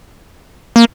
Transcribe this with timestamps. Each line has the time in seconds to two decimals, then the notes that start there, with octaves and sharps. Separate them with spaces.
0.76 A#3